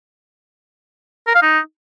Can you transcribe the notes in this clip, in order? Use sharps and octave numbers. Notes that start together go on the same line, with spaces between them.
A#4
F5
D#4